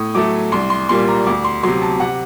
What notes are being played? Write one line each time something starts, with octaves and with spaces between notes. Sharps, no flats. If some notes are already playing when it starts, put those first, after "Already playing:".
Already playing: A2 D#6
F#3 A3 D6
C2 C6
C6
A#2 G3 A#3 C6
A#5
D2 D6
C6
C3 F#3 C6
A5
C3 F#5